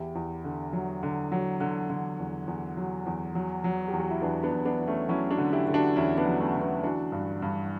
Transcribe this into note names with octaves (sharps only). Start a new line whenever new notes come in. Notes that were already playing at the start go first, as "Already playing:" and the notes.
Already playing: E2 E4 G4
E2
D3
F#3
D3
F#3
D3
D3
E2
E2
F#3
E2
F#3
F#3
G4
E2
F#4
E4
E2 B3 D4
B3 D4
E2
B3 D4
E2
A3 C#4
F#3 C#4 E4
D4 F#4
D3
E4 G4
D3
D4 F#4
E2 C#4 E4
B3 D4
F#3
A3 C#4
D3
B3 D4
E3 D4 F#4
G2
G2